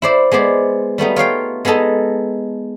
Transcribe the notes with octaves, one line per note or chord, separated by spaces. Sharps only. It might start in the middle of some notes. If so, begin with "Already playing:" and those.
E4 C5 D5
G#3 B3 C5 D5
G3 A3 B3 D#4
F4 C#5 F5 G5
G#3 B3 D#4 A4 D#5